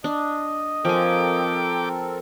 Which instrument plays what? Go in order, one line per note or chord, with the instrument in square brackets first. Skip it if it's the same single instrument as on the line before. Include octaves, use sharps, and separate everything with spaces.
[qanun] D4 [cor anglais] D#5
[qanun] F3 G#5 [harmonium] C4 A4 A#4 [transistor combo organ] G5 D6